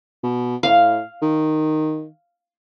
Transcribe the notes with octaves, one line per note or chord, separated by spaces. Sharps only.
B2
A2 F5
D#3